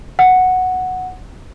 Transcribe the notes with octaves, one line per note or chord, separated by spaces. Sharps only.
F#5